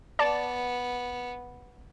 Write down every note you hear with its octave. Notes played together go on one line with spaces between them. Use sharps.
B3 D5 A5